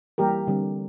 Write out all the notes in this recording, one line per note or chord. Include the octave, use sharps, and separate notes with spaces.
E3 G3 A#3 G4 A#4
D3 G3 C4